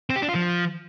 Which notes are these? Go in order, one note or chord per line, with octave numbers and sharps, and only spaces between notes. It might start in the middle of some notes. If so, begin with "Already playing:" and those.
C4
G4
D4
F4
F3